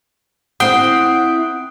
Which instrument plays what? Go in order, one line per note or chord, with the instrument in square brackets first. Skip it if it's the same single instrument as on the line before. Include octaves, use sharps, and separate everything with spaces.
[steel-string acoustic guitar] C4 E4 [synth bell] F#5 F#6 D7 [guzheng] G5 C6 [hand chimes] D#6